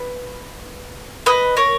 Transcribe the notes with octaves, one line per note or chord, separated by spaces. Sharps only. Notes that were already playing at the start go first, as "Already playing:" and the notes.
Already playing: B4
B4 D#5
A#4 C#5